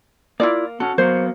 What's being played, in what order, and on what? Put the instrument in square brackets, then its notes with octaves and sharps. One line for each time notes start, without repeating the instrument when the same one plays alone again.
[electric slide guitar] A#3 [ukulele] E4 F4 D5
[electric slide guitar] C#4 A4 [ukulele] F#4
[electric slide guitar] F#3 A#3 B3 [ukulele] C5